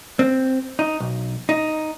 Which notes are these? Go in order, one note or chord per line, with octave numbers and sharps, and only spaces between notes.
C4
D#4
B1
D#4